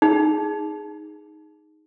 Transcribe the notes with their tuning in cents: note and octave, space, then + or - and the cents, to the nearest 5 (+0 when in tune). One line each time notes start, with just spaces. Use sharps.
D#4 +0 G#4 +0